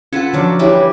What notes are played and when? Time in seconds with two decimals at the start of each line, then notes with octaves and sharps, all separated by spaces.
0.13 C#4 F4 A4 B4 F#5
0.33 D3 F3 F#3 D4
0.59 E3 G3 G4 C#5 E5